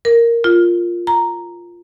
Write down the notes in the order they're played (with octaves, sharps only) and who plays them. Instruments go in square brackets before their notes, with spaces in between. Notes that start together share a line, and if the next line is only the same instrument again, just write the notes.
[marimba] A#4
F4
A#5